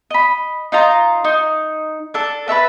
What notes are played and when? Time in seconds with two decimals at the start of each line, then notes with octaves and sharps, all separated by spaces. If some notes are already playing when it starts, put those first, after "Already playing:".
0.10 D#5 B5
0.72 D#4 F4 A#5
1.25 D#4
2.14 D4 A4
2.48 B4 C#5 E5 A5